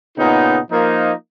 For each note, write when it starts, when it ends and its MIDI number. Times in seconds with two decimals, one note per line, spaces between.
0.17 0.58 46
0.17 0.58 49
0.17 0.58 59
0.17 0.58 63
0.71 1.11 53
0.71 1.11 58
0.71 1.11 63